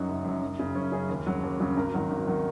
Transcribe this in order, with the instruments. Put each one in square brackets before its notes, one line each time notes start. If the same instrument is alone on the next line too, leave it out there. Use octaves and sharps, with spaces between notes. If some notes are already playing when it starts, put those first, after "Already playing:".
Already playing: [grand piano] F#2 F#3 D#4 F#4
F#1
F#2 F#3
F#1
F#2 C#3
F#1 C#4
F#2 C#3 G#4
D#2
C#3 F#3
D#2
C#3 F#3
G#1 A#4
G#2 D#3 F#3
G#1
D#3 F#3